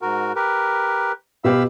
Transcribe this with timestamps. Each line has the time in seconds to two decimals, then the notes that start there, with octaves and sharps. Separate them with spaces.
0.02 G#2 F#4 A#4
0.35 G4 A#4 B4
1.44 B2 G4 B4 F5 B5 E6